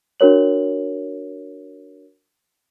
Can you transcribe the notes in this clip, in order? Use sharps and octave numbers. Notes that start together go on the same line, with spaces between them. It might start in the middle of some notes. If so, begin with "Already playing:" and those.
D4 F#4 A#4 C#5 F#7